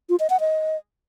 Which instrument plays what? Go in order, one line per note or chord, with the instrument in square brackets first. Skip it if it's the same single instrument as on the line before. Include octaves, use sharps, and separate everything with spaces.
[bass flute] F4
D#5
F#5
D#5